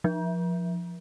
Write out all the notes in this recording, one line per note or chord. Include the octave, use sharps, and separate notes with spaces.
F3